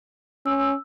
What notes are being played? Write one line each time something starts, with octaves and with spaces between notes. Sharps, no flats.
C#4 E6